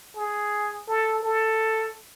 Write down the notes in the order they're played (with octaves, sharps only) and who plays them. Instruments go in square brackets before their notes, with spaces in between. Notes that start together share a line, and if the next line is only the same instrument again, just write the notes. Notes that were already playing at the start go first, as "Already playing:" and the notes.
[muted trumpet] G#4
A4
A4